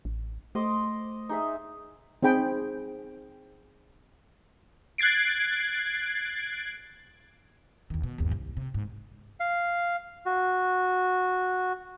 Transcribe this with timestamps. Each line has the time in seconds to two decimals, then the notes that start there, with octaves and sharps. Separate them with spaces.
0.05 A1
0.55 A3 C5 D#5 D6
1.29 D#4 G#4 E5
2.23 C4 D#4 G#4 G5 B5
4.98 F#6 G#6 A6 C7 D7
7.90 D#2 D#3
8.03 B2
8.18 G1 D#2
8.31 C2
8.57 C3
8.74 G#2
9.40 F5
10.26 F#4